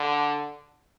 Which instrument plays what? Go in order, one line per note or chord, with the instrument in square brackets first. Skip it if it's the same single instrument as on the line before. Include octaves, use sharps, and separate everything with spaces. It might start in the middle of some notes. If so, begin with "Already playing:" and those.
Already playing: [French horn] D3